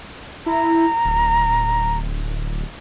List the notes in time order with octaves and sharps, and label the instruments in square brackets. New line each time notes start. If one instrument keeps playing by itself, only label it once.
[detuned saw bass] E4 [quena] A#5
[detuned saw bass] D1